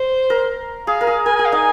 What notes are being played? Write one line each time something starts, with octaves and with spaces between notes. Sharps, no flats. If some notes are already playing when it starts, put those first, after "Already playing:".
Already playing: C5
A#4
G#4 F5
A#4
G#4
A#4 G#5
G#5
G#4
F5
D#4 G#5